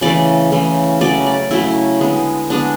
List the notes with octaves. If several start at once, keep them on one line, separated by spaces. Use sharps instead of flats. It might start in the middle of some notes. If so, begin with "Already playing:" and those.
C#3 E3 A3 D5
C#3 E3 A3
C#3 F#3 A3 D5
D5
C#3 F#3 A3 E4
D3 G#3 B3
D3 G#3 B3 D4